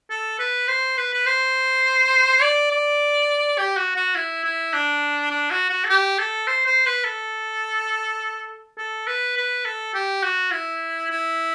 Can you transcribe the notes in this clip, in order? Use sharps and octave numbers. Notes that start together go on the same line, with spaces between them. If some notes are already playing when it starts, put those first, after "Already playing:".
A4
B4
C5
B4
B4
C5
D5
D5
G4
F#4
F#4
E4
E4
D4
D4
F#4
F#4
A4
G4
A4
C5
C5
B4
A4
A4
B4
B4
A4
G4
F#4
E4
E4